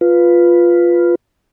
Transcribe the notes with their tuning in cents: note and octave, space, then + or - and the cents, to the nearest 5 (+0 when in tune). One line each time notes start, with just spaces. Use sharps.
F4 +0 B4 +0